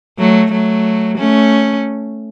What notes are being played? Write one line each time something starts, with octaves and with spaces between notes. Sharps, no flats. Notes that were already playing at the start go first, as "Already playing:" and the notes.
F#3 A3
F#3 A3
A3 C#4